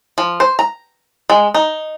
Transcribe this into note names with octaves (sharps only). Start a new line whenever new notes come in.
F3
C5
A#5
G#3
D#4